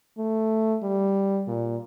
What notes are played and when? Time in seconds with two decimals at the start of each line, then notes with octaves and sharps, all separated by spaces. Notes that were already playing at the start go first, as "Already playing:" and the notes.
0.18 A3
0.83 G3
1.47 A#2